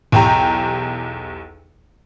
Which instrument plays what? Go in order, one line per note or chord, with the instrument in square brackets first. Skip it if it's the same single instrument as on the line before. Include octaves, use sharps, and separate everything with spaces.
[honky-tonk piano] B1 E2 G4 G5 A#5